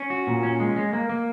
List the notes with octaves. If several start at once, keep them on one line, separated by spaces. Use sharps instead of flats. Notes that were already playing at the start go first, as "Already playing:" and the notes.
Already playing: C#4
F#4
A#2
C#4
G#3
G#3
A#3
A#3